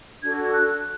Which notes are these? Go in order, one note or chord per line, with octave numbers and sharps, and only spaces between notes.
D4 F#4 A4 G#6
F#6